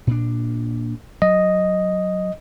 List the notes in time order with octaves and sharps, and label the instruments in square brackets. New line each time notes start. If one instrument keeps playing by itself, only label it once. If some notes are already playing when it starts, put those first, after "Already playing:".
[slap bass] A#2 D4
[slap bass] F#3 [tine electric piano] D#5